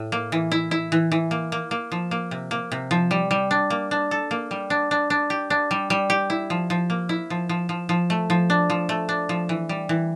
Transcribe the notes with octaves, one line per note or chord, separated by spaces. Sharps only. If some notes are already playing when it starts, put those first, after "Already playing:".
Already playing: A2
A#3
E3
E4
E4
E3
E3
A#3
A#3
A#3
F3
A#3
C3
A#3
C3
F3
G3
G3
D4
A#3
D4
A4
A#3
G3
D4
D4
D4
G4
D4
G3
G3
G4
E4
F3
F3
A#3
E4
F3
F3
F3
F3
A3
F3
D4
F3
A3
D4
F3
E3
G3
E3